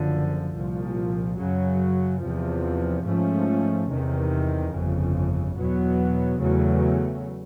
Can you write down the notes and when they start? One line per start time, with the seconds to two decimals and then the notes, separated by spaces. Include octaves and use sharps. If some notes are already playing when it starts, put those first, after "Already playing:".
Already playing: F#1 F#2 D3 F3
0.56 C2 A#2 F3
1.39 F#2 C#3 F#3
2.22 E2 C3 F3
3.06 G#2 F3 A3 C#4
3.90 E2 C3 D#3
4.73 G1 F2 C#3
5.56 E2 B2 F#3 B3
6.40 E2 C#3 F#3 A3